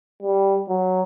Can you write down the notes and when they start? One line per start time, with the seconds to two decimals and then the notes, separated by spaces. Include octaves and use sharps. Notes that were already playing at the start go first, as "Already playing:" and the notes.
0.23 G3
0.69 F#3